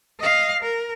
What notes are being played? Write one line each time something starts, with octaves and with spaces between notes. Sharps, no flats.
D#5 F5
A#4